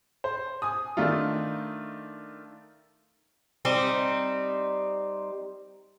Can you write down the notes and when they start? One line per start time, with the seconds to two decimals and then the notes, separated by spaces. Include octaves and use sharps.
0.24 C5
0.62 G#5 D#6
0.97 D#3 A3 D4 D#4 F4
3.65 G3 C4 D#4